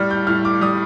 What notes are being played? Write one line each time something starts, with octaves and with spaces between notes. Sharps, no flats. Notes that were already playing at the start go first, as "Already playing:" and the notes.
Already playing: A2 G3 F6
G6
A2 F6
D6
G3 D#6